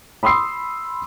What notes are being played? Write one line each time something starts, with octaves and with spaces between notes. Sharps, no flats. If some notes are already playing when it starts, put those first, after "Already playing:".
B5 C6 D#6 E6 C7